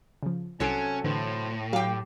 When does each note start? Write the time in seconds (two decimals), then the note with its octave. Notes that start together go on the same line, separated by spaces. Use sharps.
0.23 C#3 F3
0.60 C2 C3 F#3 C#4 A4 G#5 C7 D7
1.04 A2 D3 E3 C5
1.73 F#3 G4 F5 G5